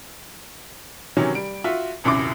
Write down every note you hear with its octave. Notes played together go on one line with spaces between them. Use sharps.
C3 D#3 E3 F#3 C#4
G3 D7
F4 F#4 E5
D#1 C2 F#2 E4 D6